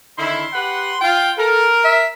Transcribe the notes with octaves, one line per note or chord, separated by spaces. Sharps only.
D3 D#3 E4 C6
G4 B4 F#5
F4 G5
A4 A#4
E5